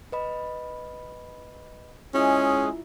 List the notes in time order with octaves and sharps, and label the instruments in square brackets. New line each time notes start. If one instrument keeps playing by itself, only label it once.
[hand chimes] B4 D#5 B5
[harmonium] G#3 G#4 [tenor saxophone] C#4 [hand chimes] E4 F4 E5